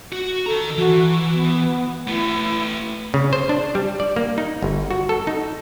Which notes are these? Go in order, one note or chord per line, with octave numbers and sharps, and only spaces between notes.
F#4
D#3 A4 A#5
E3 F#4
B3
A3 E4 B4
C#3
C5
D4
G3
D5
A#3
D#4
G1
F#4
A4
D#4